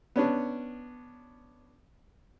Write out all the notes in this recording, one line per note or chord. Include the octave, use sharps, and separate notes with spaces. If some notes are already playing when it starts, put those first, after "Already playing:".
B3 C#4 D4